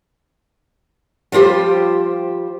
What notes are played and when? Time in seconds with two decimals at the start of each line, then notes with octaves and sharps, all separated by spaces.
1.32 F3 G3 F4 G4 C5